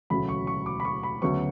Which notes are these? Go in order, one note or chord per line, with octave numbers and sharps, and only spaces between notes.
E1 D2 C#3 F#3 A3 B5
C#6
C#6
D6
B5
C#6
B5
D2 C#3 F#3 B3 C#6